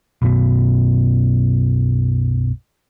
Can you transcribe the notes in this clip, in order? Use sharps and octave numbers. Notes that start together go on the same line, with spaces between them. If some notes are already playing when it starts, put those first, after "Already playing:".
B1 F#2 B2